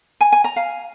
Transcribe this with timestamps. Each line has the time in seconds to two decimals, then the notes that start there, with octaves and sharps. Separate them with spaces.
0.21 G#5
0.32 G#5
0.44 A#5
0.56 F5